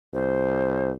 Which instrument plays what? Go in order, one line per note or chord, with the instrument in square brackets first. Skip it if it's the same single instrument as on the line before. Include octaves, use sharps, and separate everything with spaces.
[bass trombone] C2 [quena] C5